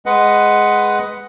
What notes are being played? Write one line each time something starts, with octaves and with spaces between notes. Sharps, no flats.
G#3 B4 D#5 F#5